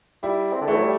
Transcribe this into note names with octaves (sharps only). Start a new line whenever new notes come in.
G3 E4
C4
D3
E3 A3
F#3
G3